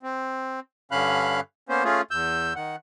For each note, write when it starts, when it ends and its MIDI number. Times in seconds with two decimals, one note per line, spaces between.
0.03 0.60 60
0.92 1.40 43
0.92 1.40 50
0.92 1.40 61
0.92 1.40 77
0.92 1.40 83
0.92 1.40 90
1.69 1.84 58
1.69 1.84 59
1.69 1.84 61
1.69 1.84 72
1.84 2.02 57
1.84 2.02 61
1.84 2.02 65
1.84 2.02 68
2.11 2.53 40
2.11 2.53 88
2.11 2.53 91
2.56 2.76 51
2.56 2.76 78